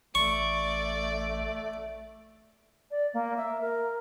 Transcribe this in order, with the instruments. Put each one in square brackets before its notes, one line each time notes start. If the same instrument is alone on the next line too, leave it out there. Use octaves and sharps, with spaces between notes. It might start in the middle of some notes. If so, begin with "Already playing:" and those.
[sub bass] A1 [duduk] A3 [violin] D5 [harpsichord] C#6
[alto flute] D5
A#3
E5
A#4